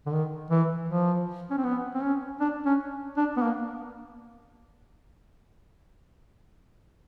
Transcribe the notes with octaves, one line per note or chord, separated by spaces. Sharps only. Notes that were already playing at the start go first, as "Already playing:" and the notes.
D3
D#3
E3
F3
C#4
C4
B3
C4
C#4
D4
C#4
D4
B3
A#3